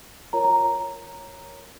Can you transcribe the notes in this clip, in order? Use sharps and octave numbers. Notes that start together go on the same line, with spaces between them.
F4 A#4 C#5 A#5
A#5